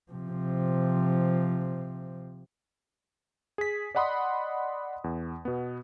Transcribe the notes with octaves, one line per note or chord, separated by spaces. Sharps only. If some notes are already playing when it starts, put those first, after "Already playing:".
C3 F3
G#4 B6
D5 D#5 F#5 B5 C6 D#6
E2
B2 B3